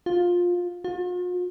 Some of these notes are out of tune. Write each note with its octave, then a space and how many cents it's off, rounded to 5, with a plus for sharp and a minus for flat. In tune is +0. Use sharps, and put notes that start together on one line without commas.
F4 +15
F4 +45